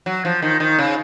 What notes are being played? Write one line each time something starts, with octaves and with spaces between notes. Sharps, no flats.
F#3
F3
D#3
D#3
C#3